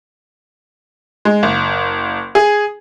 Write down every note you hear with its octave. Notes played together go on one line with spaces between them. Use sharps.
G#3
F#1
G#4